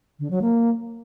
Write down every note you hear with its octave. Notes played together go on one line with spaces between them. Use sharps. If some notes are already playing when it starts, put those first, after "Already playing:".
D3
F#3
A#3